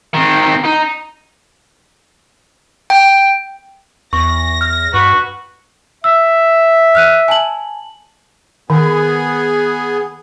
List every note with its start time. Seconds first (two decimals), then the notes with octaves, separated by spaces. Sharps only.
0.14 D#3 C4
0.65 D#4
2.90 G5
4.13 E2 C#6 A#6
4.61 F6
4.94 G2 F#4 B4
6.04 E5 E6
6.95 F6 F#6 D#7
7.28 G#5 A5 F#7
8.70 D#3 B3 G#4